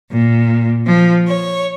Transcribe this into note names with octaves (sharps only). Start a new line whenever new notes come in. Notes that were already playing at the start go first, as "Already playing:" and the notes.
A#2
F3
C#5